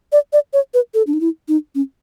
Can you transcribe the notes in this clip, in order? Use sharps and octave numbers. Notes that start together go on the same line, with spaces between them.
D5
D5
C#5
B4
A4
D4
D#4
E4
D#4
C#4